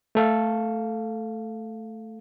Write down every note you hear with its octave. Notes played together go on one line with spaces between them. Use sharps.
A3 A4 F5